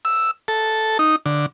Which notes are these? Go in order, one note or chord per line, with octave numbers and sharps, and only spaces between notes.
E6
A4
D#4
D3